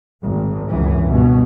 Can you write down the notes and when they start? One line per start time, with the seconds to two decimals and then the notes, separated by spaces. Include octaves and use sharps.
0.23 G#1
0.68 C#2 F#2 E3
1.10 G2 B2